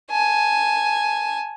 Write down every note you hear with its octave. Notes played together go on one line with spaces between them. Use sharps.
G#5 A5